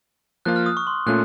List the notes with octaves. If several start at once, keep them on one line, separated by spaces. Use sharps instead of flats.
F3 A#3 F4 F#6
F6
D#6
C#6
C6
A#2 A3 C#4 F4 F#6